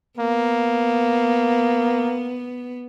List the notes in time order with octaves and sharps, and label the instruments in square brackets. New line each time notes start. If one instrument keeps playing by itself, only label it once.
[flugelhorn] A#3 [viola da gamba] B3